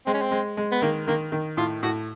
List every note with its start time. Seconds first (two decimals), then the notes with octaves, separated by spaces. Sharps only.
0.06 G#3 C4
0.14 C#4
0.22 C4
0.31 G#3
0.57 G#3
0.72 B3
0.82 D#3 A#3
1.07 D#3 A#3
1.32 D#3
1.57 A2 F4
1.83 A2 F#4